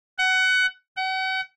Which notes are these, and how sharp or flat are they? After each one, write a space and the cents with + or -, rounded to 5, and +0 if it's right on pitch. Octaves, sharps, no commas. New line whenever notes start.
F#5 +20
F#5 +40